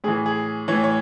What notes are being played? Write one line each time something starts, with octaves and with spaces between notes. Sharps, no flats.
A2 E3 G#4
G#4
A2 E3 C#5
C#5